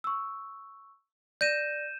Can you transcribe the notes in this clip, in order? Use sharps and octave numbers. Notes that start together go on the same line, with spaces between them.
C#6 E6
D5 G6 A#6 D#7 E7